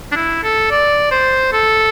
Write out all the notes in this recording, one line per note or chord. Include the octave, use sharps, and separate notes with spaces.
D4
E4
A4
D5
C5
A4